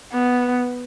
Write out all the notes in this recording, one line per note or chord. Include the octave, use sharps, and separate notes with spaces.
B3